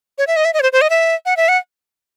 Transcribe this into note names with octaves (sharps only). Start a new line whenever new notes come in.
C#5
E5
D#5
E5
D#5
C#5
C5
C5
D#5
E5
F#5
E5
F#5